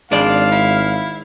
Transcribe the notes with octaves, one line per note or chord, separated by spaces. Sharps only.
G#1 G#3 D4 D5 F5
E4